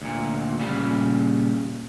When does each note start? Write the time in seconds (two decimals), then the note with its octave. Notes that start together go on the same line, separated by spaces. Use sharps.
0.02 D2 A#2
0.59 A#2 C#3 G3